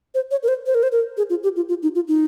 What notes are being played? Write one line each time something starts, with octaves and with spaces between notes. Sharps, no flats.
C5
C#5
A#4
C5
C5
A#4
C5
A#4
G#4
F4
G4
F4
F4
D#4
F4
D#4